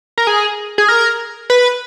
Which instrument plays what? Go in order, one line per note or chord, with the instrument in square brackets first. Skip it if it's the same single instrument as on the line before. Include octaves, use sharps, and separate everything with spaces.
[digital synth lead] A#4
G#4
G#4
A#4
B4